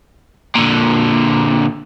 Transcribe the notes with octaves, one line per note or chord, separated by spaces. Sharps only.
A#2 D3